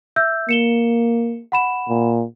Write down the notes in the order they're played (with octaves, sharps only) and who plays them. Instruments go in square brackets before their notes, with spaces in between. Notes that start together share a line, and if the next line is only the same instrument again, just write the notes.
[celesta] E5 E6 G6
[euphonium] A#3 [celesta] C#7 E7 G7
[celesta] F#5 B5 E7
[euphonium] A#2